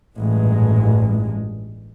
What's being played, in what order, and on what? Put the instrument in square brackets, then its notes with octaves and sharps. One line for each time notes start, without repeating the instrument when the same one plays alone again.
[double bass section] A1 G2 A#2 G#3